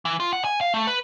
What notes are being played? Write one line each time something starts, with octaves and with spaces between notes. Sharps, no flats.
E3
F4
F#5
G#5
F5
A3
B4